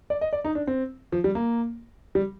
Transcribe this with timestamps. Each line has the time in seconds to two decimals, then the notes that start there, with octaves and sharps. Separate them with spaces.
0.10 D5
0.21 D#5
0.33 D5
0.45 D#4
0.55 D4
0.67 C4
1.12 F3
1.24 G3
1.35 A#3
2.15 G3